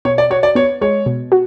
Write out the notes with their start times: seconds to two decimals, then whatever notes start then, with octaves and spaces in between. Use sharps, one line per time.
0.05 B2 C#5
0.18 D5
0.31 F#4 C#5
0.43 D5
0.55 B3 C#5
0.81 G#3 C#5
1.06 B2
1.32 F#4